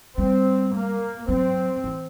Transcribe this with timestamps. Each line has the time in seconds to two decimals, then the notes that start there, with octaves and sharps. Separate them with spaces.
0.18 G3 C4
0.73 A#3
1.29 F#3 C4
1.84 E3